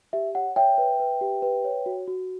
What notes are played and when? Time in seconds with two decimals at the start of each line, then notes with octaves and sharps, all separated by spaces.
0.13 G4 E5
0.35 C#5 F#5
0.56 C#5 E5 G5
0.78 B4
1.00 B4
1.21 G4
1.42 B4
1.65 C#5
1.86 F#4
2.08 F#4